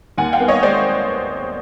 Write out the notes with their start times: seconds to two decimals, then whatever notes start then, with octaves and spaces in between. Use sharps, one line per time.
0.18 D#2 F#5 G#5
0.33 F5 G5
0.40 B3
0.48 C#5 D#5
0.63 G#3 C5 D5